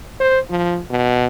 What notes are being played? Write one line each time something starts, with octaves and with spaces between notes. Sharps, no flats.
C5
F3
B2